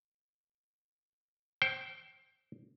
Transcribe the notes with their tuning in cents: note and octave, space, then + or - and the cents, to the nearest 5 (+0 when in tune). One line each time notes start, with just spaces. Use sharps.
C5 +20 G5 -20